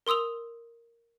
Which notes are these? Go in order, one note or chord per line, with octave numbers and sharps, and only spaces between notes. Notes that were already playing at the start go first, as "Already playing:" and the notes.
A#4 C6 D#6 E6 F7